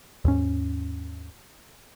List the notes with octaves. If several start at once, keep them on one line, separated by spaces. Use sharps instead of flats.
D#2 G#2 C#4